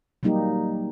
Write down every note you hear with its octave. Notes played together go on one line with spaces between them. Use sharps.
F#3 G3 A#3 D#4 G4